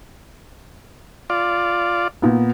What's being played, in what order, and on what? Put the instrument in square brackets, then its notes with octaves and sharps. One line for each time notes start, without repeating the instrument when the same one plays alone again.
[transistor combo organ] F4 D5
[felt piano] A#2 B3